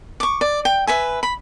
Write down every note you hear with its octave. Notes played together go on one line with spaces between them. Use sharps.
C#6 D6
D5
G5
B4 E5 G#5
B5